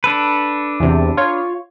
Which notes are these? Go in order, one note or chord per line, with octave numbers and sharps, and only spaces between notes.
D4 A4 B4
E2 C3
F4 C#5